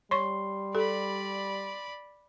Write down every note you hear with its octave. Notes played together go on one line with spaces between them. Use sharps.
G3 C#5 C6 C#6
G4 A4 D5 B5